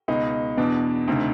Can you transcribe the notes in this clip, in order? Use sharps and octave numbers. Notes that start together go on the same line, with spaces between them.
C#2 B2 D#4
E2 B2 D4
D2 C3 D#3